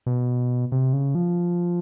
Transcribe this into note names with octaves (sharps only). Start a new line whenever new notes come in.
B2
C3
C#3
F3